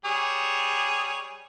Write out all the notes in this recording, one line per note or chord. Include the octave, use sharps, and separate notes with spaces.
G3 G#4 C#5